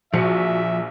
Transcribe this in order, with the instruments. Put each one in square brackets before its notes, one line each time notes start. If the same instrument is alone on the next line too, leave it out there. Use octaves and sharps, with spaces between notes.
[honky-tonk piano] A#1 C#7 [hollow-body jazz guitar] F3 [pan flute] F#4 [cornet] E5